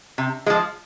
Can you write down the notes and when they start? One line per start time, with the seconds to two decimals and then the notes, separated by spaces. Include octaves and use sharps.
0.18 C3
0.46 F3 G#3